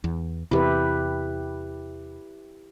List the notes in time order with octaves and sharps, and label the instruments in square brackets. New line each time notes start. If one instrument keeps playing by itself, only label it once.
[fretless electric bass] E2
[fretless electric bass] E2 C3 [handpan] E4 G4 B4